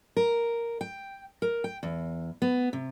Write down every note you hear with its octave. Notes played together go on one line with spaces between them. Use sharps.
A#4
G5
A#4
G5
E2
B3
C3